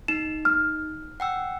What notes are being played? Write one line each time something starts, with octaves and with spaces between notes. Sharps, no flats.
D#4 E7
F6
F#5 G5 E6